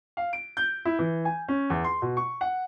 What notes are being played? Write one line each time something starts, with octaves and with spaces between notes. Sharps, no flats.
F5
D7
G6
E4
E3
G#5
C#4
E2
C6
B2
C#6
F#5